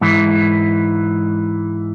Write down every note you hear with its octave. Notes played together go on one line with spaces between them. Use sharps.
G#2 E3